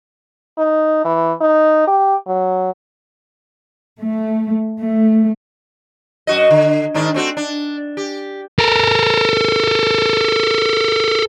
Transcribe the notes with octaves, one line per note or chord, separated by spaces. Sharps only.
D#4
E3
D#4
G4
F#3
A3
A3
F#2 F#4 D#5
D3
G#2 D#3 D4
A3 C4 F#4
D4
G4
A4 A#4